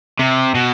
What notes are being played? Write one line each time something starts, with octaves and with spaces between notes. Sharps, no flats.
C3
B2